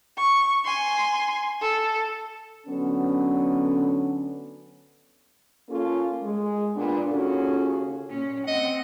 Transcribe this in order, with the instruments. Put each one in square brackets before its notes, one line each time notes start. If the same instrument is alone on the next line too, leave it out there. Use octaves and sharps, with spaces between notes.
[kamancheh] C#6
G#5 C6
A4
[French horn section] D3 F#3 B3 C#4
A#3 C#4 F4 A4
G#3
A#2 B3 D4
D#2 C#3 C#4 F4 F#4 A4
[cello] A#2 C#4
[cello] C4 F#5 [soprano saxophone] D#5